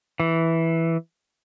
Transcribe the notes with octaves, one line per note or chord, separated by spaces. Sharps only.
E3